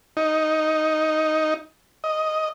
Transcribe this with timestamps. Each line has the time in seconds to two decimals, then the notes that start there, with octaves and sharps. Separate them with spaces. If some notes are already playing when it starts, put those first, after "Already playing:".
0.17 D#4
2.04 D#5